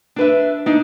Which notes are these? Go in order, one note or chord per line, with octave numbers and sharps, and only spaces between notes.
D4 B4 E5
D4 D#4